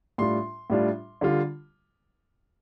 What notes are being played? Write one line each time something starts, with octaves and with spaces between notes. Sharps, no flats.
A2 G3 D4 F4 C6
A2 G3 D4 F4
D3 G3 F4